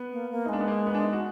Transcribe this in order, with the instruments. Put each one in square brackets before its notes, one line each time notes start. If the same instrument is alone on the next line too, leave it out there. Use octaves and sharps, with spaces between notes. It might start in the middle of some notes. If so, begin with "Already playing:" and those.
Already playing: [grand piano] B3
[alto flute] A#3
A#3
[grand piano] D#4
[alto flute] G#3 [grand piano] D4
[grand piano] B3
A#3
B3
D4
D#4
F#4